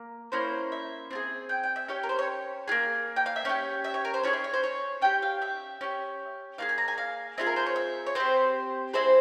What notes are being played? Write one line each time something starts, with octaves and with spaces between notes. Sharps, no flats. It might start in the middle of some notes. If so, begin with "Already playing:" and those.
Already playing: A#3
A#3 C#4 E4 C5
E5
C4 F4 G#4
G5
G5
E5
C#4 G4 C#5
A#4
C5
C#5
A#3 F4 G#4
G5
F5
E5
C#4 G4 C#5
E5
C#5
A#4
C5
C#4 F4 G#4 C#5
E5
C#5
C5
C#5
C#4 G4 G5
F5
E5
C#4 G4
A#3 F4 G#4 F5
G#5
A#5
G#5
F5
C4 F4 G#4 E5
A#4
C5
C#5
E5
C#5
C4 G4 C5
C4 E4 G#4 C5